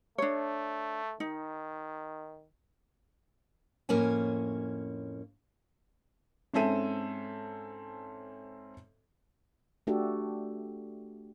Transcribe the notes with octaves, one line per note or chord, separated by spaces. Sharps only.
A3 D4 C#5
D#3 D#4
F2 A2 A#3 C#4 C#5 G#5
G#2 C4 C#4 A4 E5 D#7
A3 D4 F#4 G4 A4